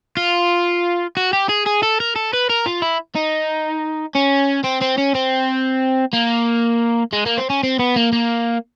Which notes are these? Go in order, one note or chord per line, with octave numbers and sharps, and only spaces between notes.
F4
F#4
G4
G#4
G#4
A4
A#4
A4
B4
A#4
F4
E4
D#4
C#4
C4
C4
C#4
C4
A#3
G#3
A#3
C4
C#4
C4
B3
A#3
A#3